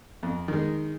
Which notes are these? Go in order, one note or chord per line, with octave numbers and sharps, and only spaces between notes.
F2
D#3 G#3